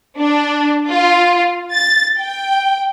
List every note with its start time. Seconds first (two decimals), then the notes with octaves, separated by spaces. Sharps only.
0.18 D4
0.90 F4
1.72 A6
2.18 G5